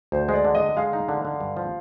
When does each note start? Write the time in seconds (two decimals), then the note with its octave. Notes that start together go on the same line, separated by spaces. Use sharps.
0.12 D2 C5
0.29 G#3 D5
0.45 D3
0.55 D#5
0.60 D3
0.77 G#3 F5
0.93 D#4
1.09 D3
1.25 D3
1.40 G2
1.57 F3